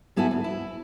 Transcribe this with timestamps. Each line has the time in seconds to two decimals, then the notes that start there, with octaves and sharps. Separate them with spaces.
0.16 G#2 B3 E4 F#4 A4 G#5
0.31 D2
0.44 E4